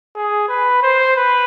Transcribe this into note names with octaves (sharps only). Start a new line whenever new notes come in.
G#4
B4
C5
B4